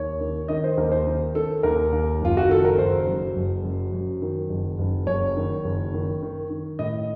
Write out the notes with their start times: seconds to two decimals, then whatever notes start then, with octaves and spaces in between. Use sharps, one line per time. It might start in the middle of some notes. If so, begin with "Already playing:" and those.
Already playing: D#2 C#5
0.21 D#3
0.48 D#3 D#5
0.64 C5
0.77 D#2 A#4
0.92 C5
1.07 D#3
1.35 D#3 A4
1.63 D#2 A#4
1.92 D#2
2.21 F#1 F4
2.37 F#4
2.49 D#3 A4
2.65 A#4
2.78 F#1 C5
3.07 F#2
3.36 F#1
3.64 F#2
3.93 F#2
4.22 D#3
4.49 F#1
4.79 F#1
5.07 F#1 C#5
5.37 D#3
5.64 F#1
5.94 D#3
6.23 D#3
6.50 D#3
6.79 A2 D#5